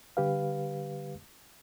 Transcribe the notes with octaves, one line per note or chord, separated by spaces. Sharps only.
D3 G3 G4 B4 F5